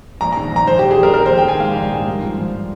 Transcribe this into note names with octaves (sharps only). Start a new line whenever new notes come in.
A#1 A#5
D#3 A#5
A#1 A#5
A#1 C5
A#1 G4
G#4
A#1 A#4
D#3 A#4
A#1 C5
G5
D#3 G#5
G#2 F5
A#1
G#2
G2
F3
F3